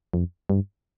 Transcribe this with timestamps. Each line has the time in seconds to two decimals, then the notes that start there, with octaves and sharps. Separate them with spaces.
0.14 F2
0.50 G2